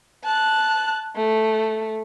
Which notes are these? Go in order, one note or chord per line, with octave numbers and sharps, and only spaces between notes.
A5 F#6
A3